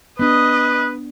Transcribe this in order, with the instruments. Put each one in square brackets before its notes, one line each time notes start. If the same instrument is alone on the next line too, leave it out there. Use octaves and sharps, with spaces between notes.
[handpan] B3 D4 [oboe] B4 [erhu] D#5